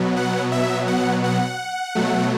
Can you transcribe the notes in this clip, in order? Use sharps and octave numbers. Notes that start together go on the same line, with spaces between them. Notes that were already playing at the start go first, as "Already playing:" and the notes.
Already playing: B2 F#3 B3
F#5
E5
F#5
F#5
B2 F#3 A3